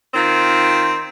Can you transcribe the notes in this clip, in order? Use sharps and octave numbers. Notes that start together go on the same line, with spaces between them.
D#3 C4 F4